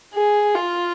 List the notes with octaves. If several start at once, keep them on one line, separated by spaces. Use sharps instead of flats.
G#4
F4